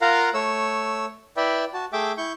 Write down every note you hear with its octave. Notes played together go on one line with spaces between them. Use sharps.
F4 A#4 F5 F#5 A#5
A3 C#5 E6
E4 B4 D5 E5 G5
F#4 A5
A3 G#4 E5 G5 D6
E4 C#6 G6